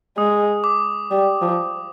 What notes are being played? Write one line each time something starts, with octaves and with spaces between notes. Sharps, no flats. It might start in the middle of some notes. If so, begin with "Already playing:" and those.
G#3 D#6
D6
G3
F3